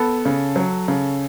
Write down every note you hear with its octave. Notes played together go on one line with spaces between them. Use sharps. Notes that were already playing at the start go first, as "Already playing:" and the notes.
Already playing: B3 A4
C#3
F#3
C#3